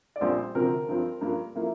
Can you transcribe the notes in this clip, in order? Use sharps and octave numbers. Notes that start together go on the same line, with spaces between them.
D5
A#1 A#2 G3 C4 C5
D2 C3 F3 C4 A#4
G2 F3 C4
G2 F3 A#3
F3 A#3 E4